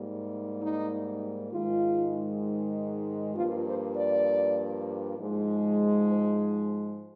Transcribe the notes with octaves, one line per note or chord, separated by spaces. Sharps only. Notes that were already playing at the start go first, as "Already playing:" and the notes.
Already playing: G#2 G3 A#3
D#4
G#2 D#3 G#3 F4
G2 F3 A#3 F4
C5
D5
G#2 F3 G#3
C5